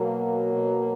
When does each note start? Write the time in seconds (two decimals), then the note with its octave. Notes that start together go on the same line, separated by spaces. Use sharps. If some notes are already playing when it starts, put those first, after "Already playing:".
Already playing: B2 F#3 A#3
0.52 B2